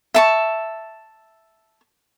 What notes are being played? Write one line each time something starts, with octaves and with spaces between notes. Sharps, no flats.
E5 A5 C#6